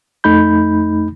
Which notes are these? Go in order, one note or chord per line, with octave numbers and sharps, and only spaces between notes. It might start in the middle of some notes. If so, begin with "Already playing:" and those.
F2 A3 D#4 B5 G6